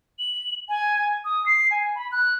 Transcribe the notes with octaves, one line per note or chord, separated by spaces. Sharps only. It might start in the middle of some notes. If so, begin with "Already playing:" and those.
F#7
G#5
D#6
C7
G#5
B5
F#6